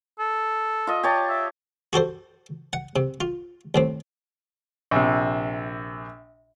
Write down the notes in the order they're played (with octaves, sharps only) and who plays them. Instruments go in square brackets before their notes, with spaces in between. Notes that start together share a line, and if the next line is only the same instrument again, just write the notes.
[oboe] A4
[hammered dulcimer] F4 D#5
G4 C#5 A5
[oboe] E5
[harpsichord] F#4 G4 A4 C5
F#5
C3
F4
D#2 A2 C4
[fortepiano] A#1 C3